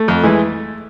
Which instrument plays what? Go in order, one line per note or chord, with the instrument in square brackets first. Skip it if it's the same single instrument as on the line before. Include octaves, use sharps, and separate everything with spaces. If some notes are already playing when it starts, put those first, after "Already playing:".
Already playing: [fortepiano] A3
F2
E3 G#3